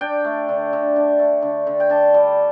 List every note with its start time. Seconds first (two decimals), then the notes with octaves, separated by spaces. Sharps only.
0.01 D4 G5
0.24 A3
0.49 D3
0.73 D3
0.96 D4
1.19 A3
1.42 D3
1.67 D3
1.80 G5
1.89 D4 A5
2.14 G3